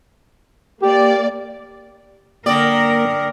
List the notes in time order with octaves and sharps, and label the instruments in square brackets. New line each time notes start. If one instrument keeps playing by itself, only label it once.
[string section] A#3 D5 [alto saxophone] G4
[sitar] D3 D5 [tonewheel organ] A#3 [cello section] A#4 [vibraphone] G5 D6 D#6